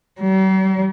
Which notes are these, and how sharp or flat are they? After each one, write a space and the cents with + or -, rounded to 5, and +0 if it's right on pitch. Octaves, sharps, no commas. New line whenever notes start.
G3 -45